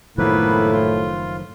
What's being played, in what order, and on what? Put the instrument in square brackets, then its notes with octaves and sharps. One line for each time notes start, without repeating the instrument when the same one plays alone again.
[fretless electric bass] F#1 D#3 F3 [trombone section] A2 [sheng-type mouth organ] A#3 B3 B4 [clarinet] E4
[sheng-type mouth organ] F4